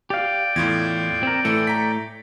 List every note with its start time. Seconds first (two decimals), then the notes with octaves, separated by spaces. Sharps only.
0.10 G4 D5 F5 G5
0.56 E2 A2 F4 G#6
1.23 C4 A#4
1.45 A2 E3 A3 A4 C#7
1.67 A#5 B6